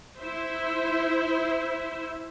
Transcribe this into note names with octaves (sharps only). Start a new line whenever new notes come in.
E4 C5 E5